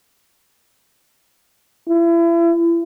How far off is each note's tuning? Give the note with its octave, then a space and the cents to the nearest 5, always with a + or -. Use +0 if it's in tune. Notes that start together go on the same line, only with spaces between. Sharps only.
E4 +35